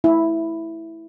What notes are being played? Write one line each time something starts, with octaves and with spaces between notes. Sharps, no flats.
E4